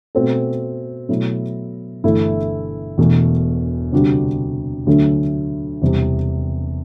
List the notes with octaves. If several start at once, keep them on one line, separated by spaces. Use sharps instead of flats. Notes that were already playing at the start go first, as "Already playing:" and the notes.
B2 A3 C4 F#4 A4
B2 F#3 A3 E4
G1 G2 E3 A3 E4
E1 E2 B2 A3
D2 C3 G3 D4 F#4
D2 D3 F#3 A3
E1 E2 C3 G3